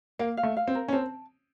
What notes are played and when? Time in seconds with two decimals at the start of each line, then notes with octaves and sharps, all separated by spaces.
0.19 A#3 F5
0.37 F5
0.43 A3
0.57 F5
0.68 C4
0.75 A#4
0.88 C#4
0.93 C4 A5